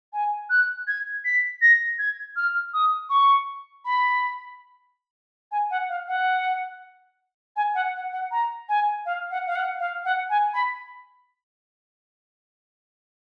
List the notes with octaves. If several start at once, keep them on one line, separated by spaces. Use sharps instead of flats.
G#5
F#6
G#6
B6
A#6
G#6
F6
D#6
C#6
B5
G#5
F#5
F5
F#5
G#5
F#5
F#5
F#5
A#5
G#5
F5
F#5
F5
F#5
F5
F#5
G#5
B5